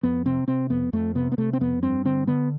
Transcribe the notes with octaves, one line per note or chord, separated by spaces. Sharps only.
F2 B3
C3 C4
C3 C4
F2 B3
F2 A3
C3 B3
B3
C3 A3
C4
F2 B3
G2 C4
D3 C4
D3 B3